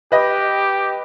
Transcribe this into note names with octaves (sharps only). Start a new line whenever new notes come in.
G4 B4 D#5